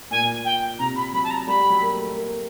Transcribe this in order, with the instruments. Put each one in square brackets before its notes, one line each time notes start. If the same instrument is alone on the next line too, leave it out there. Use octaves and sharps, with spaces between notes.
[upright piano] A#2 [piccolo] G#5
[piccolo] G5
[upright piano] C3 [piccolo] A#5
[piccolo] B5
[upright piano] F#3 [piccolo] B5
[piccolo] A5
A#5
[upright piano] G3 [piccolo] B5
[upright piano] F#3
A#3
A3
A#3